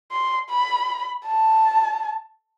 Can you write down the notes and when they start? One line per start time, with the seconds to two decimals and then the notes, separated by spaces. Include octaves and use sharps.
0.12 C6
0.50 B5
1.27 A5